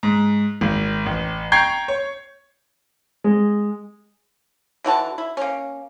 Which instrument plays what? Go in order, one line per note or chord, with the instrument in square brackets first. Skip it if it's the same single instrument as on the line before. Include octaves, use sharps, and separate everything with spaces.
[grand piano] G#2
G#1
A1
G5 A#5 C#6 G6 G#6 C7
C#5
[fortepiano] G#3
[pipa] D3 E3 F#4 A5
E4
A#3 C#4